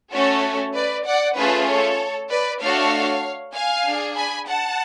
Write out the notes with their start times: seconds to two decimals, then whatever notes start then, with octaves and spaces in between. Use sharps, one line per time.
0.12 A3 C#4 F#4 A4 C#5
0.75 B4 D5
1.06 D5 F#5
1.36 A3 C#4 F4 G#4 B4
1.68 A4 C#5
2.30 B4 D5
2.60 A3 D4 F#4 A4 C#5 F5
3.54 F5 G#5
3.86 D4 G#4
4.16 G#5 B5
4.47 F#5 A5